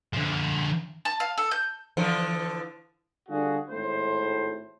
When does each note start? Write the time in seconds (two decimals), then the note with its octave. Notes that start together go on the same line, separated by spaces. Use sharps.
0.13 D3 F3
1.05 A5
1.20 F5
1.38 A4
1.51 G6
1.97 D3 E3 F3
3.29 D3 G3 D4 F4 F#4 G#4
3.71 G#1 A2 C5